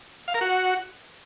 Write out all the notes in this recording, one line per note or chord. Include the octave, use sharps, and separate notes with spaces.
F5
A#4
F#4